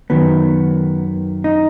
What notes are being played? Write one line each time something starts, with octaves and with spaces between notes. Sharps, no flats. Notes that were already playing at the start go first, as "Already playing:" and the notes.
F#2 D#3 F#3 B3
D#4